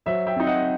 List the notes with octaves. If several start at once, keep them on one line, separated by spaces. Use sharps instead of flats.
F#3 C5 E5
E5 G5
C4 D#4
D#5 F#5